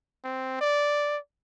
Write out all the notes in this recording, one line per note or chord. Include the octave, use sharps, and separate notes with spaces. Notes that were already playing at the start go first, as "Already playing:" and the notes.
C4
D5